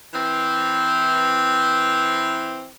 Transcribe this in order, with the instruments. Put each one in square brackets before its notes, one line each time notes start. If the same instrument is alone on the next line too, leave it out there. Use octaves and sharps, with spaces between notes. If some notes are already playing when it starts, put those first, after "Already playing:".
[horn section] E3 C4